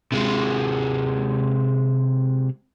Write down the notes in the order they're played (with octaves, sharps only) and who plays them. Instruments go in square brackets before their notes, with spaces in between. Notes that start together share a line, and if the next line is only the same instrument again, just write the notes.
[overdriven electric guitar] C3 G#3